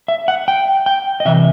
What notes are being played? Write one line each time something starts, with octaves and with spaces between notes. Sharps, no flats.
E5
F#5
G5
G5
D#5
C3 E3 E5